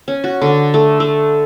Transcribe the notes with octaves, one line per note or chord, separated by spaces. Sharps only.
C#4
F#4
D3
A3
A3